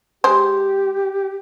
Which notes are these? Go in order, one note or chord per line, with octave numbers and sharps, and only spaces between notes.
G#3 G4 C5